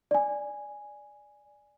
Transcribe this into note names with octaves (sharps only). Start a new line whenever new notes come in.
D5 G#5